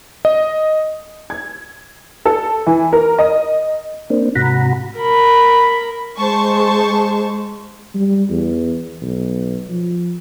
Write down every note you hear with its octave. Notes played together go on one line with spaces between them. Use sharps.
D#5
G#6
A4
E3
A#4
D#5
A#3 C4 D4
G#2 C3 F#4 F#5 A#5 B5
A#4 B5
G#3 C5 A5 C#6
G3
E2
B1
F3